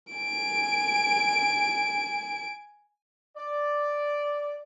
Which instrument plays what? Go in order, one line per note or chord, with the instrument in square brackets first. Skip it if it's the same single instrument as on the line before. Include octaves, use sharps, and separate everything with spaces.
[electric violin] G#5 D7
[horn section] D5